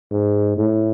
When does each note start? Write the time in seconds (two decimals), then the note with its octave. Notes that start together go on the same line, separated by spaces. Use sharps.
0.11 G#2
0.57 A2